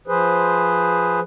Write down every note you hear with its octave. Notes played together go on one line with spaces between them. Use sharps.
F3 G#4 B4 C5